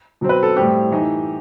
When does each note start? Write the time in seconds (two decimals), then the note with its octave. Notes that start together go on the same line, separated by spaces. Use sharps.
0.21 B2 F#3 C4
0.29 B4
0.43 A4
0.57 A2 G3 C4 G4
0.92 E3 A3 D#4